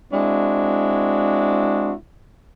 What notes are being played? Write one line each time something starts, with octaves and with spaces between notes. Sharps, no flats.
G#3 C4 D4 E4 F#4